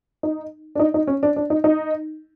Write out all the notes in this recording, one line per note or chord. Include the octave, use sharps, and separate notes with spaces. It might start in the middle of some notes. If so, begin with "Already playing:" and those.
D#4
D4
D#4
D#4
C#4
D4
D4
D#4
D#4